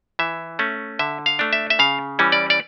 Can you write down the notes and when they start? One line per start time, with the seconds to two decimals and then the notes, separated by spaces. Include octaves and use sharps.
0.19 E3 E5
0.59 A3 C#4
0.99 D3 E5
1.26 F5
1.39 A3 D4
1.53 E5
1.70 E5
1.79 C#3 F5
2.19 E3 G3 C#4
2.32 D5
2.50 D5